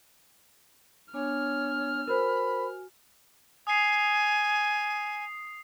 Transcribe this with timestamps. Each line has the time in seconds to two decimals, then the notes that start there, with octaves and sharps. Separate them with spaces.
1.13 B3 D4 C#5 G#5 F6
2.07 F#4 A#4 C5 G#5 B5
3.67 G#5 D#6 C7